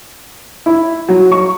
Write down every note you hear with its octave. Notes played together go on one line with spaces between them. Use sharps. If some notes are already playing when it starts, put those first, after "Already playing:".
E4
F#3
C#6